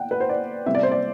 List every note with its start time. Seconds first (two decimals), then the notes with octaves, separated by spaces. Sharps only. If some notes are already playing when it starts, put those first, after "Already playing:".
Already playing: F#5 G5
0.11 B4
0.20 C5
0.29 D5
0.66 C3 G3 B3 E5
0.75 D5
0.83 C5
0.91 D5